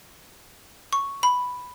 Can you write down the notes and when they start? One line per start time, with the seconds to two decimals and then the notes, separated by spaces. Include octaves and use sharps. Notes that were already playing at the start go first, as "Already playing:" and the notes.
0.93 C#6
1.23 B5